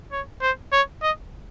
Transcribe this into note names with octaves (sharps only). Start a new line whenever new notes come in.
C#5
C5
C#5
D#5